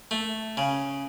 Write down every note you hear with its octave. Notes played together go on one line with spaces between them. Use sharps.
A3
C#3